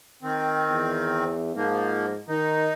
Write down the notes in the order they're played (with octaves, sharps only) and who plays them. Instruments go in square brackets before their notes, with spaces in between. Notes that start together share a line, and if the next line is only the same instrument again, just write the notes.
[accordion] D#3 C4
[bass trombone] E2
[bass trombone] G#2 [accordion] F3 A#3
[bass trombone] D#3 [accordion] D#4